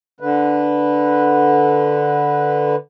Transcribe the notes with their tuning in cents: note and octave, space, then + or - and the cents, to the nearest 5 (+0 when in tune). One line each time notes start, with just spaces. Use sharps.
D3 +0 B4 +0